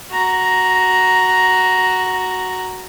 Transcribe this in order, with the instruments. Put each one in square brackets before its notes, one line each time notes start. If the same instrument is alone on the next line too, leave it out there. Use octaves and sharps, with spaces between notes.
[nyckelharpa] F#4 A#5